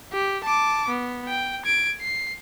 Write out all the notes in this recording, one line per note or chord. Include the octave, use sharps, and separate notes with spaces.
G4
A5 D6
B3
G5
G#6 D7
C7